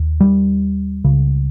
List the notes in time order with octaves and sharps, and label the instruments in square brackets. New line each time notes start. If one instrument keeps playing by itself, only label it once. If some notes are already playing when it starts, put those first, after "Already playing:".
Already playing: [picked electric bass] D#2
G3
C#2 C#3